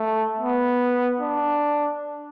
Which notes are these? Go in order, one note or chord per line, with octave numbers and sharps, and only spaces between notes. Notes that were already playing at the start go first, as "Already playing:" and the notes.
Already playing: A3
B3
D4